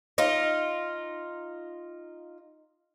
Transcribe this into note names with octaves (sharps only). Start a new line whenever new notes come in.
D#4 F4